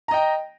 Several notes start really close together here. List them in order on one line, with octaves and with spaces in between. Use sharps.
A#5 D#5 G5